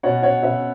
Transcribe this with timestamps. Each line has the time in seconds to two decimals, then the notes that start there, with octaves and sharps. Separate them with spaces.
0.03 B2 C#5 F#5
0.23 B2 C#5 F#5
0.43 B2 B4 E5